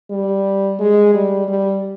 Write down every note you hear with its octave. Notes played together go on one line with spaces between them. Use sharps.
G3
G#3
G3
G3